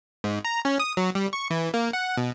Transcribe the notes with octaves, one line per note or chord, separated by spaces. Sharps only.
G#2
A#5
C#4
D#6
F#3
G3
C#6
E3
A#3
F#5
B2